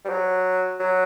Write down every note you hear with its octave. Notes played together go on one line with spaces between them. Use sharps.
G3
F#3
F#3